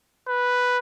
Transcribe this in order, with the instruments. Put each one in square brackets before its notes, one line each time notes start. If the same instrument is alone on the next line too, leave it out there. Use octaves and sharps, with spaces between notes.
[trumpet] B4